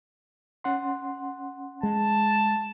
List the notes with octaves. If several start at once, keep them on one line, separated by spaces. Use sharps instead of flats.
C#4 F#5 C6
G#3 A5